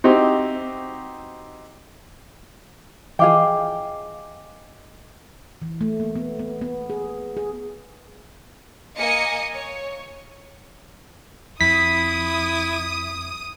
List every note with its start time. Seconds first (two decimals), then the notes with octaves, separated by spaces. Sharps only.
0.04 C4 D#4 E4 F#4 G4
3.19 E3 F3 G#4 D#5 F5 G5 D6
5.62 E3
5.81 A3
6.00 A#3
6.16 B3
6.39 B3
6.61 B3
6.90 G#4
7.37 G#4
8.97 A#3 D#5 F5 G#5 D#6 C#7
9.54 C#5
11.61 F2 E4 D#6 B6